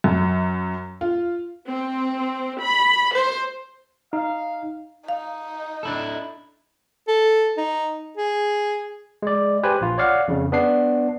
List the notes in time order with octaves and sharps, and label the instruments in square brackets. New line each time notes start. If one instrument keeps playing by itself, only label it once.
[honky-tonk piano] F#2
F4
[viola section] C4
B5
C5
[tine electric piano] D#4 [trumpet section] F5
[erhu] D#4 [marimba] F5
[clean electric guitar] D4 E4 A4
[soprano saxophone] A4
D#4
G#4
[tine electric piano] G#3 D5
G4 B4 C5 G#5
A#1 F4
C#5 D5 F5 F#5
F2 C#3
B3 D4 C7